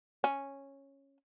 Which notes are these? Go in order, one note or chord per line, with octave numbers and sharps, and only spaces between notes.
C#4